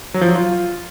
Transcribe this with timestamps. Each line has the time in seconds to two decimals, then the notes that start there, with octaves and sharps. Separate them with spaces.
0.14 F#3
0.21 F3
0.28 F#3
0.35 F4